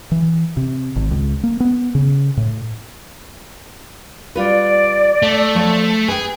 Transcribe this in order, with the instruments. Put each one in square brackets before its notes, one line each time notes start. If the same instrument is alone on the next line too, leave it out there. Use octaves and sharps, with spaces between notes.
[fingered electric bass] E3
C3
G#1
C#2
A#3
B3
C#3
A2
[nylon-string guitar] G3 F4 B4 [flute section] D5
[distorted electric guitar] A3
[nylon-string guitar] F3 A4 C#5
[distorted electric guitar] G#4 [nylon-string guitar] B4 G5